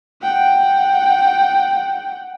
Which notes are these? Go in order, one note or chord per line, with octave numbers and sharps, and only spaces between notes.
F#5 G5